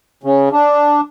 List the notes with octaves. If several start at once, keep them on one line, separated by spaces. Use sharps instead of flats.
C#3
D4